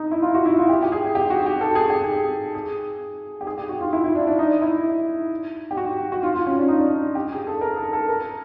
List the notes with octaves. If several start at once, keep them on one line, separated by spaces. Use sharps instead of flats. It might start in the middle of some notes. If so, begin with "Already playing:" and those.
Already playing: D#4
E4
F4
F#4
E4
F4
G4
G4
G#4
G4
F#4
G4
A4
G#4
G4
G#4
G#4
G4
G#4
G4
F#4
F4
E4
E4
D4
D4
D#4
E4
G4
F#4
F#4
F4
F4
C#4
D4
D#4
D4
G4
G#4
A4
A#4
A4
A4
A#4